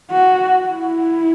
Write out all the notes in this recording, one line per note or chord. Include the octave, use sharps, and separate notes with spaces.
F#4
E4